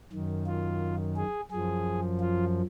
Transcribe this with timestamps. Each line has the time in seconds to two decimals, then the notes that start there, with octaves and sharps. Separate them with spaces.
0.12 F#2 D#3
0.47 F4
1.17 G#4
1.51 F#2 F3 G#4
2.20 F4